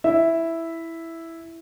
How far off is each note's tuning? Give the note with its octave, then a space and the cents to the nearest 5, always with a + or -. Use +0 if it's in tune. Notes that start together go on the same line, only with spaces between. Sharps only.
E4 +0 E5 +0